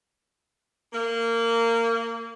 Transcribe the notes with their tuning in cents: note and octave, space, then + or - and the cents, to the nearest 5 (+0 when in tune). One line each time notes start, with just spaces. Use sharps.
A#3 -20